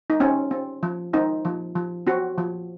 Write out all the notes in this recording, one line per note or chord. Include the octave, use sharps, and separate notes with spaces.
D#4
C4 C#4
C4
F3
C4 D#4
F3
F3
C4 F#4
F3